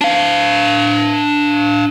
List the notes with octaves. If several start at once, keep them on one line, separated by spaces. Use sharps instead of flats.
D4 F5